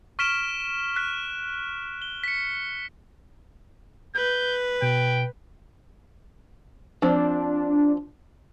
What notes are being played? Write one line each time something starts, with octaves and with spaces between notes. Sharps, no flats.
C#6 F6 B6 D7 E7 G7
F#6 B6
G7
B6 C#7
B4 G6
B2 G5
F3 C4 D4